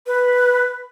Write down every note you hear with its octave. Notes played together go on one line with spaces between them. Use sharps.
B4